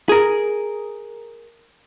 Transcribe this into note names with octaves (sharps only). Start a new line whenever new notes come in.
G#4 A#4